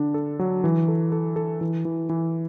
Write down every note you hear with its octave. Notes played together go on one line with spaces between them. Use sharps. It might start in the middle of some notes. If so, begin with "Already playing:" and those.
Already playing: D3 D4
A4
F#3
E3
A4
A4
A4
E3
E3
E3